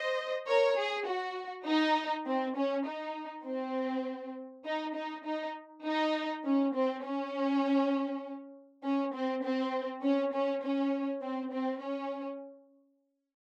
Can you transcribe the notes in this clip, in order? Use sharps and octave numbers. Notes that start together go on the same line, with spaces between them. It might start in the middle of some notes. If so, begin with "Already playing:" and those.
Already playing: C5 D#5
A#4 C#5
G#4
F#4
D#4
C4
C#4
D#4
C4
D#4
D#4
D#4
D#4
C#4
C4
C#4
C#4
C4
C4
C#4
C#4
C#4
C4
C4
C#4